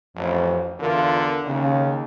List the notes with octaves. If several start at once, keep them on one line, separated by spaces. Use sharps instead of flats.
A1 F2
E2 D3 F4 A#4
D#2 C#3